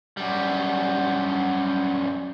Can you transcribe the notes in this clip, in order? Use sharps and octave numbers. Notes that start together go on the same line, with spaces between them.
F#2 G3